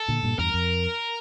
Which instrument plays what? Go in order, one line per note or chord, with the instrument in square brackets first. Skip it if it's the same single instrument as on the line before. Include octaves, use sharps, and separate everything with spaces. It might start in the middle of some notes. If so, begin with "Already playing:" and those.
Already playing: [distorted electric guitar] A4
[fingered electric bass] A#2 D3
G2 A#2
[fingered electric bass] E2 G2 [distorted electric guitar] A#4
[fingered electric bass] F2